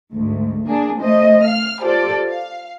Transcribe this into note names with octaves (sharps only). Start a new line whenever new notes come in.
D2 G#2
A#3 D4 G#4
A3 C5 D#5
F5 F6
F4 G4 A4 C5 D5
F5